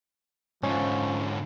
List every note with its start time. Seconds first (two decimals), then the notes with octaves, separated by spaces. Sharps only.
0.63 G#2 D3 F3 C#4